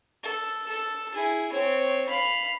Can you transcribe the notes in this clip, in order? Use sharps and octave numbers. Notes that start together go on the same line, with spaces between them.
A4
A4
E4 G#4
C4 C#5
F5 B5